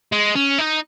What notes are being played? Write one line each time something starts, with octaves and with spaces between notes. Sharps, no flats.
G#3
C#4
D#4